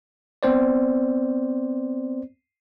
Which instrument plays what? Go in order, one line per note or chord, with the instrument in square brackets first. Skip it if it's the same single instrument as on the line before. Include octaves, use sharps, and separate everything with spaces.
[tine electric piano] B3 C4 C5 D5